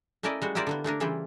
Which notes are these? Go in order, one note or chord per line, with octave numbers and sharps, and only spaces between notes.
A3 C#4 E4 A#4 D5 D#5
G3 G#3 F#4
E4 F4 G4 A#4 C5 D5
D3 A#3 B3
A3 A#3 D4 A#4
C#3 E3 G3 E4 F4 G4